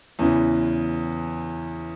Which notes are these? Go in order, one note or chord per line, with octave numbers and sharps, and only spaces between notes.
E2 C#3 E3